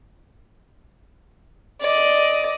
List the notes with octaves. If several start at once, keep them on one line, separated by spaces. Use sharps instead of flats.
D5 D#5